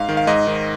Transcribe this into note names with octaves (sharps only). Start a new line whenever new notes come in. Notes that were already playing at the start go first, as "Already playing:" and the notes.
Already playing: G#2 F5
D#3
F5
G#2 D#5
D#3